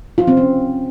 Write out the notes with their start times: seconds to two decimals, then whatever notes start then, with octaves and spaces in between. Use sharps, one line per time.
0.18 F4
0.27 C4
0.37 C#4